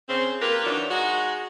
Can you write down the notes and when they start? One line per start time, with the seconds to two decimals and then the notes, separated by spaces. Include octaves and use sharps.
0.08 C#3 C4
0.41 A#3 F4 G4 A#4 B4
0.64 D#3 E3 F#3 D4
0.90 G#3 D#4 F#4